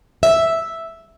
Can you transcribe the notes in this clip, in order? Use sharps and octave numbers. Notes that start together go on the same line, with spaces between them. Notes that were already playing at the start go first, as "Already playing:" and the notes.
E5